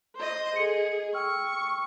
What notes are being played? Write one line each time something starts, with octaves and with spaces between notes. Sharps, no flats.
C5 D#5
G#4 A4 D#5 C#7
G5 C#6 E6 F6